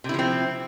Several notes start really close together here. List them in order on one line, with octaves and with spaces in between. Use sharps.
C3 E4 F3 C4